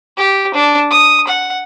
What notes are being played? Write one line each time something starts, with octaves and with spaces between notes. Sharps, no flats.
G4
D4
D#6
F#5